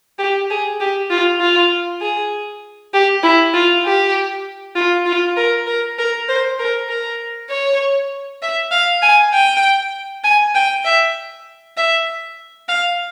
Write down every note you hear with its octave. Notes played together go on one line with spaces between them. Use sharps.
G4
G#4
G4
F4
F4
G#4
G4
E4
F4
G4
F4
F4
A#4
A#4
A#4
C5
A#4
A#4
C#5
E5
F5
G#5
G5
G#5
G5
E5
E5
F5